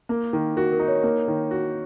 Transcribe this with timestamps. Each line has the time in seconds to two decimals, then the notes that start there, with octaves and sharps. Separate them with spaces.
0.09 A#3
0.33 D#3
0.56 F#4 A#4
0.72 A#4
0.79 D#4
0.88 C#5
1.03 A#3
1.28 D#3
1.51 F#4